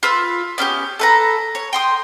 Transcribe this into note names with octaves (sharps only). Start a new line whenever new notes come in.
F4 B4 E6
B3 C#4 D4 G4
A4 B4 A#5
C#5
G5 C6 D#6